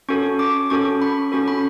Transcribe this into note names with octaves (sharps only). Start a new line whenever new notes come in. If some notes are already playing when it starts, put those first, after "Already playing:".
C#4 F#4 A4 C#6
D6
C#4 F#4 A4 C#6
B5
C#4 F#4 A4 C#6
B5